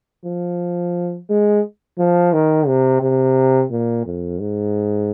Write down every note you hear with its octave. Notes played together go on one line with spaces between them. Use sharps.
F3
G#3
F3
D#3
C3
C3
A#2
F2
G#2